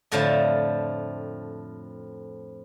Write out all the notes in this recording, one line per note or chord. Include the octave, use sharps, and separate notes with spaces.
F2 A2 D3 F3 A3 A5